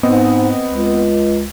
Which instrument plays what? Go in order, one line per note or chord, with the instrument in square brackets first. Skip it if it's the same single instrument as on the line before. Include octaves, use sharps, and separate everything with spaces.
[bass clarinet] G#2 [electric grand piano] B3 C4 D#5
[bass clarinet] C#2